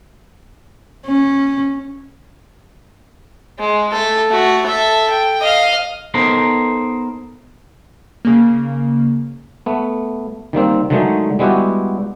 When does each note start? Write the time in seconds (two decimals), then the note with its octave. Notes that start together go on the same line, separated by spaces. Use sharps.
1.06 C#4
3.59 G#3
3.92 A3 A4
4.29 A3 F#4
4.66 A4 E5
5.10 G5
5.41 D#5 F5
6.14 B3 D#4 A4 A#4 C5
8.25 C#3 A#3
9.66 A3 B3
10.53 D#3 G3 A#3 C4
10.90 D3 D#3 F#3 G#3 A3 D#4
11.39 G3 G#3 B3 E4 F#4 G4